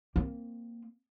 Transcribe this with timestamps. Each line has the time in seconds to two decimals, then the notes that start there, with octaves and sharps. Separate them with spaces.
0.16 A#3 C4